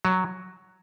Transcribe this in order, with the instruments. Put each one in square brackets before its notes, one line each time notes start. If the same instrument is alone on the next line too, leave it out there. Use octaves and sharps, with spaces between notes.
[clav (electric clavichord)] F#3